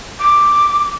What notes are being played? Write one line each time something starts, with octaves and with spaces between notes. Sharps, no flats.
D6